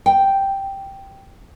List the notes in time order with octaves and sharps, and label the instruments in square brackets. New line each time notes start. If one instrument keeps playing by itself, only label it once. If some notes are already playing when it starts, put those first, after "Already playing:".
[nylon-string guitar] G5